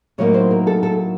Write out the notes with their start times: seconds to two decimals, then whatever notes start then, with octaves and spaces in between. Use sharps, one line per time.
0.18 A2 F#3 A#3 D#4 C#5
0.34 C5
0.51 A#4
0.67 A4
0.83 A4